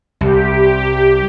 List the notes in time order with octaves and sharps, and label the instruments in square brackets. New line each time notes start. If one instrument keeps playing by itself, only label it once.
[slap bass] C2 [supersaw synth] G4